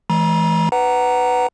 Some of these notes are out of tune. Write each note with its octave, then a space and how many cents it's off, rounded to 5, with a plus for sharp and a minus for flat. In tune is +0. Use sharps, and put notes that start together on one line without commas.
E3 +0 G#3 +40 A#5 +40
B4 +10 F#5 +15 A#5 +0